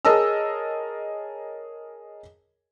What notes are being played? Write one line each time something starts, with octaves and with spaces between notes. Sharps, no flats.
G#4 A#4 C#5 D#5 A5 E6